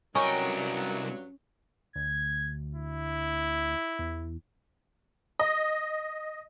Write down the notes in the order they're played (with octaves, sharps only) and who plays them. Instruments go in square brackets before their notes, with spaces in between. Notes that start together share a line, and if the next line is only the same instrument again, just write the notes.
[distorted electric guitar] C2 G5 [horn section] G2 F#3 [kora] C#4 [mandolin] A#4 D#5 C#6
[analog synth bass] D2 [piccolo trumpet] G#6
[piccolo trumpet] E4
[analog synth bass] E2
[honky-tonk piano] D#5